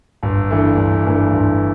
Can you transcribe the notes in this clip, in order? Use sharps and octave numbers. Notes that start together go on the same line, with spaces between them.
G1
G2 E3 A3
G1
G2 E3 A3
G1